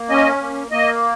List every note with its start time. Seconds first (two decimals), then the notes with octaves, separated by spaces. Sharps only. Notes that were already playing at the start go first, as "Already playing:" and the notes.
Already playing: A#3
0.09 C#4 D#5
0.40 A#3
0.71 A#3 D#5